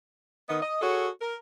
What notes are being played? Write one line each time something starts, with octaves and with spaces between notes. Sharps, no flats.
D#3 B3 D#5
D#5
F#4 G#4 A4 C#5
A#4